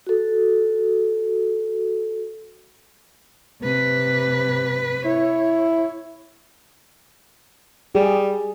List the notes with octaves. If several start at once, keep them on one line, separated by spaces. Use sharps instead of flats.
F#4 A4
C3 B4
E4 C#5
G3 G#4